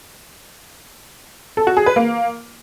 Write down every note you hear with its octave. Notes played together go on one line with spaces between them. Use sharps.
A4
F#4
G#4
B4
A#3